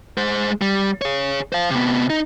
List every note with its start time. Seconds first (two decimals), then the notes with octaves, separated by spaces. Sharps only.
0.17 G#3 C5
0.61 G3
1.02 G#4 C#5
1.52 C5 F5
1.71 C3 B3
2.10 D#4